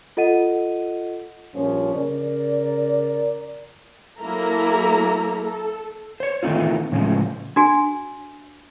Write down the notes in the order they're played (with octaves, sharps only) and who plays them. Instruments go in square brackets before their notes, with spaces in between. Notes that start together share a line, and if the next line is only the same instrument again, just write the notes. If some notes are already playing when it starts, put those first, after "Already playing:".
[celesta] F4 A4 D#5 F#5 D#7
[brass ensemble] A#1 G2 F3 C#4
C#3 A#4 D5
[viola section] F#3 A#3 E4 A4 A#5
A4
[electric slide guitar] C5 C#5
D#3 E3 A3 C4 D#4 F4
A2 C#3 F3 G#3
[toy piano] D4 F#4 G#5